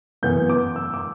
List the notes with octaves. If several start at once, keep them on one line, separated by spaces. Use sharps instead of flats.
F#2 E3 B3 G6
D6
E6
D6